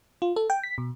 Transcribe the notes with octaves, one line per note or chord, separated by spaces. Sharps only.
F4
A4
G5
B6
B2